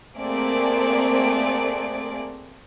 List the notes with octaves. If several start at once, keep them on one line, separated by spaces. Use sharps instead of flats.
A3 A#3 C4 G#4 D5 D7